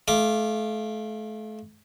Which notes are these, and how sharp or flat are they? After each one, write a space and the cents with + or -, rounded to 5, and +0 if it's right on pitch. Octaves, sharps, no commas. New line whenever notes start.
A3 -35 F5 -15 D6 +0